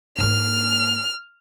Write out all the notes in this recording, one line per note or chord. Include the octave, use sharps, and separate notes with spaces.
G#2 A#3 F6